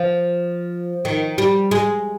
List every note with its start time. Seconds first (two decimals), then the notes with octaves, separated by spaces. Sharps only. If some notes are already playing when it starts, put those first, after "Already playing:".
Already playing: F3
1.05 D#3
1.38 G3
1.71 G#3